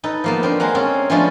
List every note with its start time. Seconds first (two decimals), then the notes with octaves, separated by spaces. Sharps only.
0.04 D#4 A4 B4
0.24 F3 A#3 B3
0.43 C4 D4 A#4
0.60 G#3 A#3 F#5 A#5
0.75 C4 C#4 G#4 A5
1.10 F3 G#3 A3 B3 C#4 D4